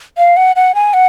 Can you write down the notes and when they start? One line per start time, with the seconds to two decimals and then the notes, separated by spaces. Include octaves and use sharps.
0.18 F5
0.37 F#5
0.56 F#5
0.75 G#5
0.94 F#5